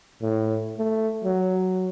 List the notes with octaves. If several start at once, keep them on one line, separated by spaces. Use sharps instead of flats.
A2
A3
F#3